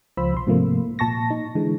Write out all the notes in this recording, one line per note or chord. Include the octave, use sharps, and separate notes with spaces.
C#2 F3 F4 C5 B5 E6
B1 C6
G#2 C3 F3 A3 A#3
A#2 A5 C#6 A#6
D#4
D3 E3 G#3